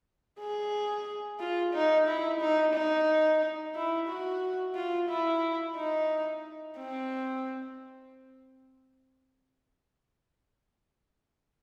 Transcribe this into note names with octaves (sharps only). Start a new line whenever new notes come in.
G#4
F4
D#4
E4
D#4
D#4
E4
F#4
F4
E4
D#4
C4